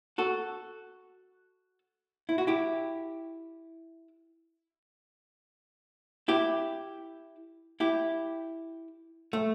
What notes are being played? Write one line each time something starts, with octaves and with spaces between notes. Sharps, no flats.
F#4 A4
E4
F#4
E4 G4
E4 G4
E4 G4
A3